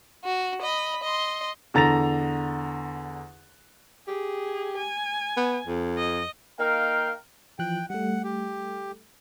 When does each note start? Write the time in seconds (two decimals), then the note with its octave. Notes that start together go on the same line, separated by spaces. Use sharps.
0.24 F#4
0.61 D#5 B5
1.03 D#5 C6
1.74 E2 D3 A#5 A6 A#6 F7
4.08 G4 G#4
4.78 G#5
5.37 B3
5.67 F2
5.98 D#5
6.59 A#3 D#4 A#4 F5 G5
7.59 E3 F3 G5 F#6
7.90 G3 A3 F#5
8.24 G4